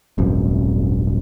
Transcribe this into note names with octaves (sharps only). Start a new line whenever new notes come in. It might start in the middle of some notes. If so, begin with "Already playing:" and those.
D#1 G#1 F#2